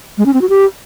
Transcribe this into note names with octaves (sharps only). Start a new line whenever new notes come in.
G#3
C#4
C4
F#4
G4